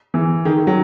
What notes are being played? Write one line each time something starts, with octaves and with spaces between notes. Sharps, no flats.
E3
D#3
D#3
F#3